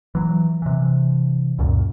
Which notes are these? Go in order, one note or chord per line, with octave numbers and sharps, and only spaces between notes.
E3 F#3
C3 E3
C#2 F#2 A#2